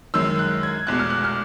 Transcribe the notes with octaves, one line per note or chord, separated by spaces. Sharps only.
F#2 D#3 G#3 E6
F#6
G#6
F1 E2 B2 G#3 F#6
F6
F#6
F6